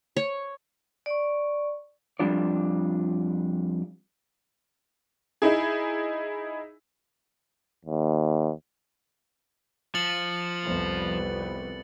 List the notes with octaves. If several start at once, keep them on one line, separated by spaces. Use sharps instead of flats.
C#5
D5 C#6
F2 G3 D4 F4 D5
D#4 E4 G#4
D#2
F3 A6 C#7 F#7
C2 F2 B3